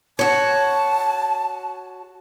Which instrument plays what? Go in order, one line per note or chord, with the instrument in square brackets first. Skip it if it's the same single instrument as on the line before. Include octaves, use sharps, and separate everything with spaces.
[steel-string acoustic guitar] F#4 C#5 [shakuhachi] A5